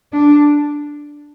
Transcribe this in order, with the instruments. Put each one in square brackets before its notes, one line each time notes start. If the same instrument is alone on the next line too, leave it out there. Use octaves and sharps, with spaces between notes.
[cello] D4